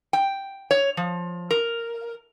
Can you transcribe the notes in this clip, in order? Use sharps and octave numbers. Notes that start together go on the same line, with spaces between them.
G5
C#5
F3
A#4